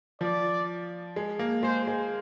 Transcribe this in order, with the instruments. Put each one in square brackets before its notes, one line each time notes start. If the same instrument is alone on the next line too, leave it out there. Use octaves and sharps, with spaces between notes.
[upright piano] F3 [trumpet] D5
[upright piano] G#3
A#3
[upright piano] G#3 [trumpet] C5
[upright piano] G#3